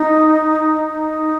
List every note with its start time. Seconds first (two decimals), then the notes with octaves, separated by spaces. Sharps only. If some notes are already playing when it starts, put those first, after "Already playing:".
Already playing: D#4
0.89 D#4